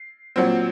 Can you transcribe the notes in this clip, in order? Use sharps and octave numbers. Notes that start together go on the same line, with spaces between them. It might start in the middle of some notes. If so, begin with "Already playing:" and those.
Already playing: C7
A#2 F#3 C4